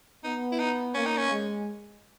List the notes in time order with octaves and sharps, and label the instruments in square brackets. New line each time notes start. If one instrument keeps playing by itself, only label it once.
[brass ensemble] B3 [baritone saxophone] D#4
[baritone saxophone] E4
D#4
[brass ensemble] A#3 [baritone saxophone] C#4
[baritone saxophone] D#4
C#4
[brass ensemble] G#3